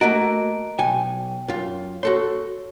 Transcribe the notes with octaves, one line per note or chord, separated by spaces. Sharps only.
A3 A#3 F#4 D#5 A#5 D7
B1 G5 G#5
F#2 F4
F#4 A4 C#5 C6